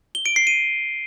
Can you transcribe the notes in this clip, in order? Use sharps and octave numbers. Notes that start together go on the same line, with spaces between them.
G7
D7
C7
D#7